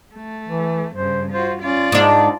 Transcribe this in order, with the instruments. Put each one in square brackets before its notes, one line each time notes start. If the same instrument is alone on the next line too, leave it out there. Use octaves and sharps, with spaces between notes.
[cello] A3
[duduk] E3
[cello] G2 C#3 [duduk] C5
[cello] F4 F#4 [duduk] C5
[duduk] C#4 [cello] F4 D5
[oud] G#2 D4 [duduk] D#4